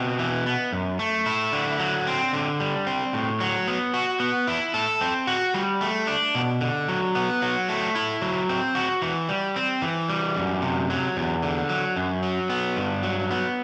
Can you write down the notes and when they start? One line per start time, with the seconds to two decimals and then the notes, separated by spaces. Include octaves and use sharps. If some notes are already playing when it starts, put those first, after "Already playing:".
Already playing: B2 C4
0.19 E3
0.46 B3
0.73 F#2
0.99 A3
1.26 E4
1.53 D3
1.79 F#3
2.07 C4
2.33 D3
2.60 G3
2.87 C4
3.13 A2
3.40 F#3
3.67 B3
3.94 F#4
4.20 B3
4.47 E4
4.74 A4
5.01 C4
5.27 F#4
5.54 G3
5.81 A3
6.07 D4
6.35 B2
6.61 D3
6.88 F#3
7.15 B3
7.42 F#3
7.69 A3
7.95 E4
8.22 F#3
8.49 C4
8.75 F#4
9.02 E3
9.29 G3
9.56 C4
9.82 E3
10.09 G3
10.37 F#2
10.62 C3
10.90 F#3
11.17 E2
11.42 D3
11.69 F#3
11.96 F#2
12.23 F#3
12.50 B3
12.76 G2
13.03 F#3
13.31 B3